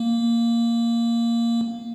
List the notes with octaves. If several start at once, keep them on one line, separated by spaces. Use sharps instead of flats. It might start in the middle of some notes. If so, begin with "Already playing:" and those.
Already playing: A#3